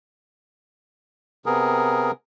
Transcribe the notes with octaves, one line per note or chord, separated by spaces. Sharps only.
C3 B3 G#4 A#4